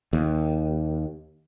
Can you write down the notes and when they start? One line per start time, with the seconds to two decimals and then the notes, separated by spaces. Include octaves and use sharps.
0.13 D#2